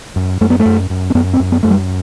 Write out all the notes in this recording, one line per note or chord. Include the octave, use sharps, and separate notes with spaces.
F#2
F#2 A3
B3
A3
F#2
F#2
C4
F#2 B3
C4
F#2
B3
F#2 A3
G3